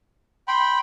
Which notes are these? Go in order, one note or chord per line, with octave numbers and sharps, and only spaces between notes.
G5 B5 C6